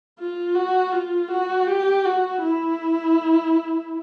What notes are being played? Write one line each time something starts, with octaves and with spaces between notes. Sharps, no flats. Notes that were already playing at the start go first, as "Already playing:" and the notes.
F4
F#4
F4
F#4
G4
F#4
E4